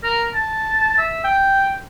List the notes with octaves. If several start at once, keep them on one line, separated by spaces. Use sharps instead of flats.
A#4
A5
E5
G5